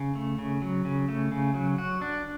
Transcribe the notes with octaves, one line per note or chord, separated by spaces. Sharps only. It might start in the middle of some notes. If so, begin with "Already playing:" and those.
Already playing: C#3
A3
C#3
F#3
C#3
A3
C#3
F#3
F#4
D4